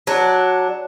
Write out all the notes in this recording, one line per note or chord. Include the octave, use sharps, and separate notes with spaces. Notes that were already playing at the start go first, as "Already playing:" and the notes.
F#3 D4